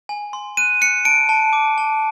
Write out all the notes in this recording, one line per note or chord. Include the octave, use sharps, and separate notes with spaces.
G#5
C6
F#6 D#7
F#6 C#7
A5 D7
A5
D6
A5